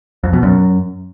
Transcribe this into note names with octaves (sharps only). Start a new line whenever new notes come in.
F2
B2
F#2